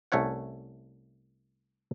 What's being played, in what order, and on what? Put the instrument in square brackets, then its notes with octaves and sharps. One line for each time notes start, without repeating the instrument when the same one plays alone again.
[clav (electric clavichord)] C2 A3 C#4 C#5 F#5